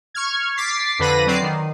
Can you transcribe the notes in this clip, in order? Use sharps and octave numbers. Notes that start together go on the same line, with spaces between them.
C#6 F6 G#6
D6 A6 B6 C7
F2 D3 B4 B5 A#6 D#7
F#3 C4 D5 C7
D#3